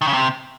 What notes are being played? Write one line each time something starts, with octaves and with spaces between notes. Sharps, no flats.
D#3
C#3
C3